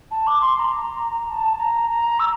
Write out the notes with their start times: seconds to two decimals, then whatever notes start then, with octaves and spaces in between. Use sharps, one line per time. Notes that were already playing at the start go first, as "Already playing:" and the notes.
0.11 A5
0.27 D6
0.41 C6
0.56 C6
0.59 A#5
1.30 A5
1.59 A#5
1.90 A#5
2.20 E6